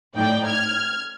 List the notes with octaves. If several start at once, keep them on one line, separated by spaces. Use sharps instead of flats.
A2 D#4 D5 G5
F6 G#6